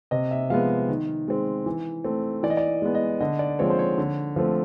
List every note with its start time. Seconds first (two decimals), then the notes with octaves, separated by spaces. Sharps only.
0.11 C3 D#5
0.31 E5
0.50 F3 G#3 B3 F5
0.89 D#3
1.28 G#3 C4
1.66 E3
2.04 A3 C4
2.43 E3 D5
2.50 D#5
2.57 D5
2.82 G#3 B3
2.95 D#5
3.20 D3 D#5
3.39 D5
3.59 F3 G#3 C4 C#5
3.70 C5
3.79 C#5
3.98 D3
4.36 F3 A3 C4